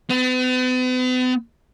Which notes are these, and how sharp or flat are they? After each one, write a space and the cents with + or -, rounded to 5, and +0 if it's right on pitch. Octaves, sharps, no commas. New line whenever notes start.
B3 +45